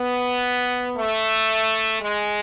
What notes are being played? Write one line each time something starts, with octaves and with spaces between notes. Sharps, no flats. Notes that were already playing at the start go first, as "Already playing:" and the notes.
Already playing: B3
A3
G#3